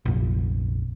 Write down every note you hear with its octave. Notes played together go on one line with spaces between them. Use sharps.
F1 A#1